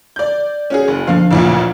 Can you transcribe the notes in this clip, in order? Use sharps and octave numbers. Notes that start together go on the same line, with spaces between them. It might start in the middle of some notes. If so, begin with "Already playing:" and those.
D5 G6
C#4 F#4 G#4
F#1
D3 F3 F5
A1 D2 A#2